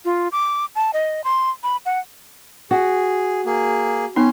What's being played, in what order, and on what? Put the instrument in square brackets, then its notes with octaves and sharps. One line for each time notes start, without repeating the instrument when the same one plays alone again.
[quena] F4
D6
A5
D#5
C6
B5
F#5
[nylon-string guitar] F#4 [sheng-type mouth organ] G#4
[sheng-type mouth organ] A#3 G#4
[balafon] B3 D#4 [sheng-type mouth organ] C#4 C6